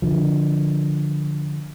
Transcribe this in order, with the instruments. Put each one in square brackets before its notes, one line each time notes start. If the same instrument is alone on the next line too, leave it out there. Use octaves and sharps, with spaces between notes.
[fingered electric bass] D3 F3